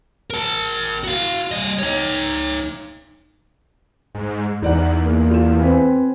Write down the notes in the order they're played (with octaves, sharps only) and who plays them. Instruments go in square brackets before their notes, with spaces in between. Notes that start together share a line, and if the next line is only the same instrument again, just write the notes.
[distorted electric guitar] A#4 A5
F#4 F5
G3 D#5
D#4 C#5
[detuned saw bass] G#2
[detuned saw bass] E2 [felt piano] D#4 D5 F#5
[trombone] A#3
[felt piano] F4 E7
[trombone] C4 [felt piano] B4 G#5